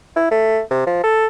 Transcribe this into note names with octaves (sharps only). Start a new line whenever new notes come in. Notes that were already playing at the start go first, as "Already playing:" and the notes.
E4
A3
C3
F3
A4